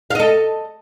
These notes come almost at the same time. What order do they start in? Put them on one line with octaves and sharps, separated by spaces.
F5 D#5 A4